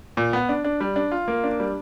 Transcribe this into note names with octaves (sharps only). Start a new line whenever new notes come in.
A#2
B3
D4
D4
G3
D4
F4
A#3
D4
G3